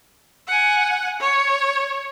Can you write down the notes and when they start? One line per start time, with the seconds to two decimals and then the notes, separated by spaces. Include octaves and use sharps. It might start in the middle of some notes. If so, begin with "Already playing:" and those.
0.47 F#5 G#5
1.20 C#5